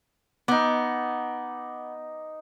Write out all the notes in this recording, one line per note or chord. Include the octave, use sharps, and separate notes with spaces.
B3 D#4 D6